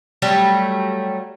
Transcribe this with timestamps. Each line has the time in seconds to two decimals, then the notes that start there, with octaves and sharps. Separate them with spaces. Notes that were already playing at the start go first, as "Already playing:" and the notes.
0.22 F#3 G3 A3